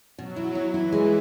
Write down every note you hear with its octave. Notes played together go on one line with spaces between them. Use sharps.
B2 F#3
E4
E4
E3 E4
G#3